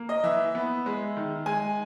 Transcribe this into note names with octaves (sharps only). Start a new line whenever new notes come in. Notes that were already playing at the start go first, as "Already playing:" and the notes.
Already playing: A#3
D#5
E3 E5
B3
G#3
D#3
G#3 G#5